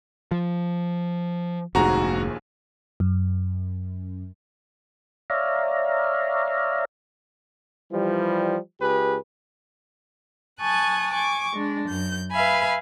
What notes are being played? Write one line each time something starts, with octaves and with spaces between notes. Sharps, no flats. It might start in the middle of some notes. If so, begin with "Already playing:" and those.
F3
F1 A#1 D#2 G#2 F#4 G#4 A#5
F#2
C#5 D5 E5 F5 A#5
E3 F3 G3
C#2 G4 G#4 B4
G#5 A5 C#6 D#6 F#6
G#5 C#6 D6
G#3 D4
F#2 G6
B4 E5 F5 G#5 B5